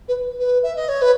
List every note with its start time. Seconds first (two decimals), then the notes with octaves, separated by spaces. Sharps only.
0.08 B4
0.39 B4
0.63 E5
0.76 D#5
0.88 C#5
1.01 B4